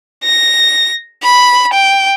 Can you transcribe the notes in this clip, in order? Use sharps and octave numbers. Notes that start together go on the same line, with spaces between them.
A#6
B5
G5